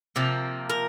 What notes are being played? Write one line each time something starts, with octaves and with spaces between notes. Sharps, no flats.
C3 F3 A#3
A#4